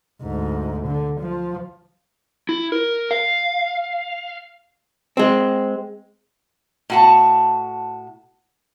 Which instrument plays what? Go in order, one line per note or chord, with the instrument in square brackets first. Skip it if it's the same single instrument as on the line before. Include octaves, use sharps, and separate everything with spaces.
[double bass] D2 G#2
D3
F3
[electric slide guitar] E4
A#4
F5
[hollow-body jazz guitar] G#3 C4
[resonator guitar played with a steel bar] A2 F#4 A5